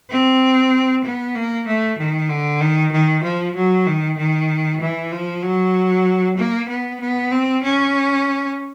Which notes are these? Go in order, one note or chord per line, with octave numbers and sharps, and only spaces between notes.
C4
B3
A#3
A3
D#3
D3
D#3
D#3
F3
F#3
D#3
D#3
E3
F3
F#3
A#3
B3
B3
C4
C#4